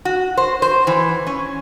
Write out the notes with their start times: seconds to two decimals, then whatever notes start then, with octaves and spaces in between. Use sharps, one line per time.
0.05 F#4
0.37 C5
0.62 C5
0.87 E3
1.27 C#4